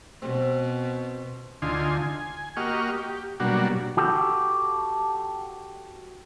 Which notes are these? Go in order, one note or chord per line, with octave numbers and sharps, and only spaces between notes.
B2 C4
D2 D3 D#4 F4 G#5 C6
G#5
A#3 F#4 G4 D#5 C#6 F6
G4
B2 F#3 G3 A#3 D4 F#4
F#4 G4 A4